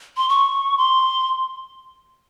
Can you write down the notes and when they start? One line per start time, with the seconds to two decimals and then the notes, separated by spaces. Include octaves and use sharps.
0.17 C6
0.29 C#6
0.78 C6